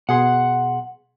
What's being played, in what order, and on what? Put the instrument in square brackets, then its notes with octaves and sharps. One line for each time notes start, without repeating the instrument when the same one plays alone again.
[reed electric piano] B2 G#4 C6 [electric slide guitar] F#5